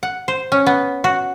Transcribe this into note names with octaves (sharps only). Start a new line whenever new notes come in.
F#5
C5
C#4
B3
F#4